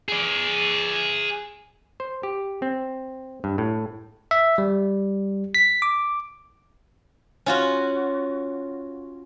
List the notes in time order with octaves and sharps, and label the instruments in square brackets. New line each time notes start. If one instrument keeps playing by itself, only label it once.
[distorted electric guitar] G#4 D5
[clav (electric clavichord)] C5
G4
C4
G2
A2
[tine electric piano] E5
G3
B6
D6
[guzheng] C#4 F4 F#4